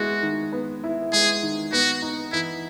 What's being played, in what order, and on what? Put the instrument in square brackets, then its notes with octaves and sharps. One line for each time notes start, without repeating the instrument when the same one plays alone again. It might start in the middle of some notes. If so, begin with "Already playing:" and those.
Already playing: [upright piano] G#3 B3 E4 [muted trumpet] F#4
[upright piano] D#3
B3
E4
[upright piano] G#3 [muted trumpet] G#4
[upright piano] D#3
[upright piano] B3 [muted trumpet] F#4
[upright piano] D#4
[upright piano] E3 [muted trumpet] E4